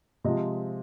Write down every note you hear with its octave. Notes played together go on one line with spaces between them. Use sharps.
C3 F3 G#3 D#5